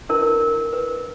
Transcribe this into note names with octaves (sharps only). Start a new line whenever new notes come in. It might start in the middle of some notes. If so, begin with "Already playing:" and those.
D4 E4 A#4 B4
A#4
B4